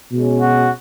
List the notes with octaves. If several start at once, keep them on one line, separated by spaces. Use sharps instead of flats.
B2 G#3 C#4
F#4